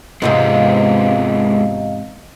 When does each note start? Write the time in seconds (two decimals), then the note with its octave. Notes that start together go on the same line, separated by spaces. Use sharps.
0.22 E2 G#2 C3 G#3 B3 F4 D#5 F5